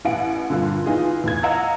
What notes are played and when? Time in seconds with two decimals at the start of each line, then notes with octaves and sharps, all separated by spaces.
0.05 A1 E3 E4 F#5 D7
0.50 G2 A#2 D3
0.86 E3 D#4 F4 G#4
1.24 E2 A2 G#6
1.43 D#5 F5 F#5 A#5 E6 G#6